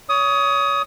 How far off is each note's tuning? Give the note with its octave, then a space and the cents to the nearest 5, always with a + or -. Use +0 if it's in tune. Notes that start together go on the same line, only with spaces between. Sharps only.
C#5 +30 D#6 +15